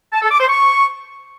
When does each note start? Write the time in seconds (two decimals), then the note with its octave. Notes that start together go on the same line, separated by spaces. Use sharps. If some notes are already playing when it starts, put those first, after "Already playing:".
0.13 A5
0.22 A4
0.31 D6
0.40 C5
0.50 C#6